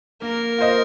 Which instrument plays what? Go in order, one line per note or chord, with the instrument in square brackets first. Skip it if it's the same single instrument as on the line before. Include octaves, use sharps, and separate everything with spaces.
[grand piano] A#3 [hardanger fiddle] A#4
[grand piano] F4 C5 D#5